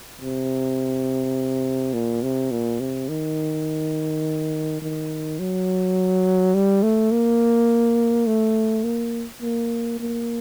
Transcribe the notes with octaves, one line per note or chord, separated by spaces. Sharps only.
C3
A#2
C3
A#2
C3
D#3
D#3
F#3
G3
A3
A#3
A3
A#3
A#3
A#3